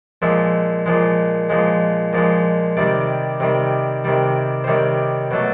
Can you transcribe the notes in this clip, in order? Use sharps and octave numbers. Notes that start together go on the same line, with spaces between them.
A#2 F3 G#3 E5
A#2 F3 G#3
A#2 F3 G#3
A#2 F3 G#3
C3 D#3 G3 D5
C3 D#3 G3
C3 D#3 G3
C5
C3 D#3 G3 C#5
B2 F#3 A3